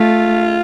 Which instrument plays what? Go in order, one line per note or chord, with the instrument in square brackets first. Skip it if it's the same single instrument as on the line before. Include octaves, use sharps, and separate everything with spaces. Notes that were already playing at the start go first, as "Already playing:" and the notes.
Already playing: [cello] A3 [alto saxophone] F4